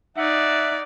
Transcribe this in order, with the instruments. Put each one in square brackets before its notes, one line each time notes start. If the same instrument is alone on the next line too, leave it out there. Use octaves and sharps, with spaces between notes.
[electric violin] D#4 D5 [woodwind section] E5 F#5